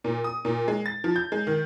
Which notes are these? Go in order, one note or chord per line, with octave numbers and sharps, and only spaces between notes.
A#2
D#6
A#2
G#3
A6
F3
G6
G#3
D#3